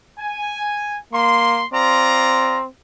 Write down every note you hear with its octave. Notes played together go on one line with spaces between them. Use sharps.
G#5
A#3 C6
C4 F4 D5 A#5